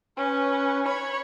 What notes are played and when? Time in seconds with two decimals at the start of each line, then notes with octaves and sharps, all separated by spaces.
0.18 C#4 B4
0.86 C#5 B5